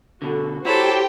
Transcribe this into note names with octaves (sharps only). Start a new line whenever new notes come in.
B2 D3 F#4 A4
E4 F#4 G4 A4 C5 C#5 G5